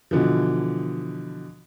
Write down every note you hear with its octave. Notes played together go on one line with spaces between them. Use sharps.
B2 D3 E3 F3